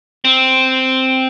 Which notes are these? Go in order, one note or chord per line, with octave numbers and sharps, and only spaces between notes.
C4